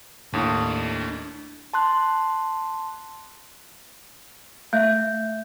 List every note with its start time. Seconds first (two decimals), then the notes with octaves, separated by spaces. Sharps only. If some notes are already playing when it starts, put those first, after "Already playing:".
0.33 D#2 A2 D4 D#4
1.73 A5 C6 F#6
4.73 A3 E5 G6